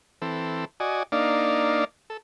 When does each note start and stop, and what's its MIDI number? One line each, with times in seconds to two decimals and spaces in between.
0.22 0.65 52
0.22 0.65 60
0.22 0.65 69
0.80 1.03 66
0.80 1.03 74
0.80 1.03 75
0.80 1.03 80
1.12 1.84 58
1.12 1.84 62
1.12 1.84 63
1.12 1.84 74
1.12 1.84 77
2.10 2.17 69